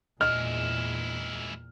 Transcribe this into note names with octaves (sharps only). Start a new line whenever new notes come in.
E2 A#2 G#3 E4 D#5 F6